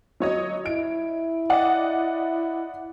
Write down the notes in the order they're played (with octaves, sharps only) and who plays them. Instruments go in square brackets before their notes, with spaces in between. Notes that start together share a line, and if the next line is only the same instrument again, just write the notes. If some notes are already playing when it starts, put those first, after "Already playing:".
[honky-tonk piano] F#3 C#5 D#5
[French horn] E4 [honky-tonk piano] D7
[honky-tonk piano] D5 D#5 F#5